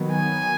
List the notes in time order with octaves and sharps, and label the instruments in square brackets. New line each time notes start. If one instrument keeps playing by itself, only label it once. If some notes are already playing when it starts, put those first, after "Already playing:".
Already playing: [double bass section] D#3 F#3 B3
[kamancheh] G#5